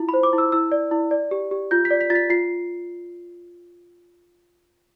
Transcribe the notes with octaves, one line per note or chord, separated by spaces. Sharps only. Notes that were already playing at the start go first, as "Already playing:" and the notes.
Already playing: E4 F4
B5
C5
D6
E4
E6
E4 E6
D5
E4
D5
G4
G4
F4 G6
B6
D5
B6
F4 A6
B6
F4 C7